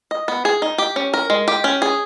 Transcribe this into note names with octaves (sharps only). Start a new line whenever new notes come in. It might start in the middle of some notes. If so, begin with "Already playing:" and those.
D#5
B3
G#4
D#4
G4
C#4
A#4
G#3
G4
C#4
G#4